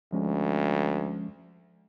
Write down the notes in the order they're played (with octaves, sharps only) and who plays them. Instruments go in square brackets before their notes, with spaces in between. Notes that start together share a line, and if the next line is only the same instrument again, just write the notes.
[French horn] D2 [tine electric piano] F3 G#3 C#4